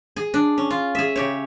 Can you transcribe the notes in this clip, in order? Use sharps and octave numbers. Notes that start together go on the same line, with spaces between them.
G#4
D4
C#4
F4
G#4 E5
C#3 G4 C#5